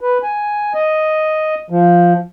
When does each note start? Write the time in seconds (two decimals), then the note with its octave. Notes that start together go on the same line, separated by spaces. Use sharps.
0.01 B4
0.23 G#5
0.74 D#5
1.70 F3